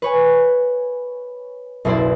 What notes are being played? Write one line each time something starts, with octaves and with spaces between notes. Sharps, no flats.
B4 C#5 G#5
F#1 B1 B2 E4 C5 D5